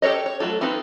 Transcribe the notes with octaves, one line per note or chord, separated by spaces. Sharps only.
G4 A4 B4 C#5 D#5
C#5
F#3 A3 F4 A4
C4 D#4 F4 A4 B4